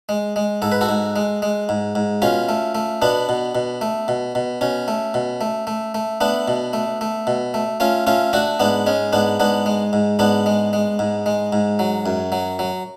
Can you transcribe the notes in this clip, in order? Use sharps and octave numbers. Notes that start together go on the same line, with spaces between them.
G#3
G#3
G#2 A4
B4
F#4 A4
G#2
G#3
G#3
G#2
G#2
B2 C#4 F4
A3
A3
B2 B3 D4
B2
B2
A3
B2
B2
B2 C#4
A3
B2
A3
A3
A3
A3 B3 D4
B2
A3
A3
B2
A3
A3 C#4 F4
A3 C#4 F4
A3 D4 F#4
G#2 B3 D4
G#3 C#4
G#2 B3 D4
G#2 B3 D4
G#3
G#2
G#2 B3 D4
G#3
G#3
G#2
G#3
G#2
F#3
F#2
F#3
F#3